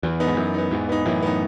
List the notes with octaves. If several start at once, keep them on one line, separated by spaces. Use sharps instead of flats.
E2 E3
B3 D#4
G#2
F#2 E3
B3 D#4
E2 G#2 E3
B3 D#4
F#2 A2 E3
B3 D#4